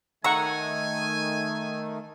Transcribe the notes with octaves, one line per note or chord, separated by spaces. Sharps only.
D#3 A3 F#5 G#5 A#5 C#6 E6